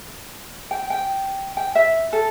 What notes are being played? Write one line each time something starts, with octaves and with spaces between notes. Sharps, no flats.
G5
G5
G5
E5
A4